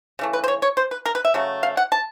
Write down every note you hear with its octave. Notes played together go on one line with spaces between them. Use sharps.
C#3 E3 A3
B4
C5
C#5
C#5
C5
B4
A#4
B4
E5
C#3 F#3 A3
F5
F#5
A5